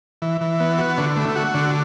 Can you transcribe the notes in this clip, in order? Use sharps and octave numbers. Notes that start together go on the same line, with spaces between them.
E3
E3
B3
F#4
D3
A3
F#4
D3